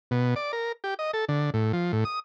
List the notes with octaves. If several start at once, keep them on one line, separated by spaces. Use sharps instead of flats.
B2
D5
A#4
G4
D#5
A4
D3
A2
F3
A2
D#6